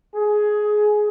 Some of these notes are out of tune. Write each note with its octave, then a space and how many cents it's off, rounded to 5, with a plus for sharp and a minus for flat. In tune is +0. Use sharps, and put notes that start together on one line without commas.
G#4 +15